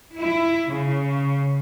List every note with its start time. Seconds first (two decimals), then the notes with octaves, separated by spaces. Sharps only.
0.16 E4
0.70 C#3